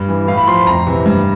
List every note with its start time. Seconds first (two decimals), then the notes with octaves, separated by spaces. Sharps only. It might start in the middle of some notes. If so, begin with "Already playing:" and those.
Already playing: G2
0.08 E3
0.27 A2 F5
0.37 B5
0.47 F3 C6
0.57 B5
0.67 F2 A#5
0.87 C3 E3
1.06 G2